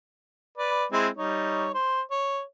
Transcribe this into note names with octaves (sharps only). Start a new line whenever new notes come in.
B4 D5
G#3 C4 E4
G3 D#4 C#5
C5
C#5